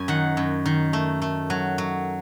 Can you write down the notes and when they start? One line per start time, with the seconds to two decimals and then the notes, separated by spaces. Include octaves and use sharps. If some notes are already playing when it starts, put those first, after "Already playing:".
Already playing: F#2 G#5
0.08 D#3 F#5
0.37 F#2
0.66 D#3
0.93 A3
1.22 A3
1.50 F#3
1.78 F#3